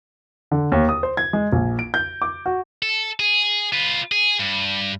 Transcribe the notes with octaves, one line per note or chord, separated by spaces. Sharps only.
D3
D#2
D#6
C5
G#6
G#3
A#1
D7
G6
D6
F#4
A4
G#4
F4 B4
G#4
G2